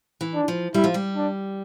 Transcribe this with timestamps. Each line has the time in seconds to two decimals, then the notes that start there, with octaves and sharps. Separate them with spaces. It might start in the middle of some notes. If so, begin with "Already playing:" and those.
0.21 E3
0.34 D4
0.48 F3
0.74 G3 E4
0.84 F3
0.94 G3
1.15 D4